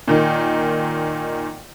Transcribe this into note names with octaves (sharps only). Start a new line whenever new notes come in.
A#2 D#3 D#4